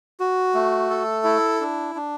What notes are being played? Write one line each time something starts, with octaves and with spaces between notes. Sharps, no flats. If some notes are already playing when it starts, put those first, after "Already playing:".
F#4
A3
A4
E4
D4
D4